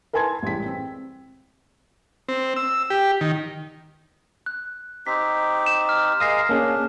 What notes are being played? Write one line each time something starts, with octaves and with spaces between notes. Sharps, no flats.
A#4 B4 G#5 A5 C6 G#6
A1 G3 G#3 B6
C4
C4
E6
G4
D#3
F#6
C4 D#4 G4 B6
E7
F6
G#3 A#4 F5 D#6 A#6 C7
A#3 C#4 D4 G#4